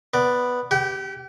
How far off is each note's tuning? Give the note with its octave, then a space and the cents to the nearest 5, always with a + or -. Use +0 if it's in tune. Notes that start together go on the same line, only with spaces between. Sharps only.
B3 +0 D5 +0
G4 -5 G5 -45